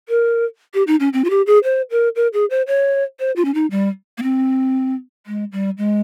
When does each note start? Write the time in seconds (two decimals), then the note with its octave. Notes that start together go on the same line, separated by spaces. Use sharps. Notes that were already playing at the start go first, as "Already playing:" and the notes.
0.09 A#4
0.74 G4
0.87 D#4
1.00 C#4
1.13 C4
1.24 F4
1.30 G4
1.47 G#4
1.64 C5
1.91 A#4
2.16 A#4
2.33 G#4
2.50 C5
2.67 C#5
3.19 C5
3.36 F4
3.45 C#4
3.54 D#4
3.71 G3
4.18 A#3
4.23 C4
5.26 G#3
5.52 G3
5.78 G#3